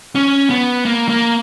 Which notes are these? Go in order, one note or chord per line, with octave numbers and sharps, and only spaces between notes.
C#4
B3
A#3
A#3